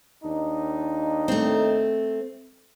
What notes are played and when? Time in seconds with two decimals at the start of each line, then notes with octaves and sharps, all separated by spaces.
0.24 D#2 D4 D#4
1.28 A3 C4